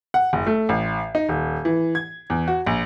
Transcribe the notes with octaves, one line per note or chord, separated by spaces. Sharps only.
F#5
F#1
A3
A1
D#4
D#1
E3
G#6
E2
F#4
A#1